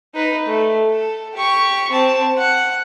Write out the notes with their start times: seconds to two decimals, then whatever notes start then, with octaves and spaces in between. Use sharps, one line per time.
0.15 D#4 B4
0.46 A3
0.91 A4
1.35 G4 C#6
1.90 C4 A5
2.38 F#5